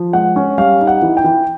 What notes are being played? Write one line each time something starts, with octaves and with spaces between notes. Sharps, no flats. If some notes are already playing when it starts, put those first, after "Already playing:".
Already playing: F3
G#3 F#5
C#4
G3 F5
D#4
F#5
E3
G5
E3